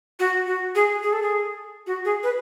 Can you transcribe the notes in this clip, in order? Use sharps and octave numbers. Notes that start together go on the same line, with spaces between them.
F#4
F#4
G#4
G#4
A4
G#4
F#4
G#4
B4